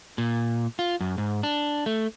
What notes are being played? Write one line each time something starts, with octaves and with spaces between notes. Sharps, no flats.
A#2
F4
F#2
G#2
D4
A3